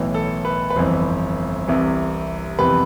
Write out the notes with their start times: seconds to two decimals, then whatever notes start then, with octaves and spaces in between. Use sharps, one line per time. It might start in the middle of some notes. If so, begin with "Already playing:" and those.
Already playing: B1 A2 E3
0.14 A4
0.45 B4
0.70 B4
0.76 G1 F2 E3 C5
1.68 C2 C3 E3
2.59 F2 C3 E3 G3 B3 B4